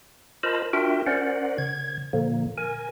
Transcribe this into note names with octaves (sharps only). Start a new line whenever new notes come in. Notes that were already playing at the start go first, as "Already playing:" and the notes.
F4 A#4 C5 D#5 A5 B5
D4 F4 F#4 A#4 E5 G5
C#4 A#4 C5 D5 F#5
C#3 G#6
A#2 D3 F3 A#3
A#4 G#5